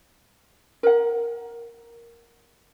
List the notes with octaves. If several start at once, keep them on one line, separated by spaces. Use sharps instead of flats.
A#4 F#5